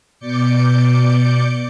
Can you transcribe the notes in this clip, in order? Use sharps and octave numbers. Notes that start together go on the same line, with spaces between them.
B2 D5 D6 G6 C#7